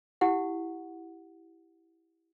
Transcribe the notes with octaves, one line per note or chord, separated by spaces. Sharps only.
E4 G4 F#5